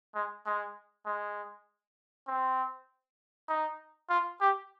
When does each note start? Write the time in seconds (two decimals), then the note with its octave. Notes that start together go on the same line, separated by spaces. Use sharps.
0.15 G#3
0.46 G#3
1.06 G#3
2.27 C4
3.49 D#4
4.09 F4
4.41 G4